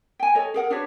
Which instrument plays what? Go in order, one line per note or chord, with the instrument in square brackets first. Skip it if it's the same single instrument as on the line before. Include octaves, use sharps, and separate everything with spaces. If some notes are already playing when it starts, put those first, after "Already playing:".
[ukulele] G5 G#5
A4 C#5 D#5
G#4 A#4 F#5
D4 F#4 B4 C#5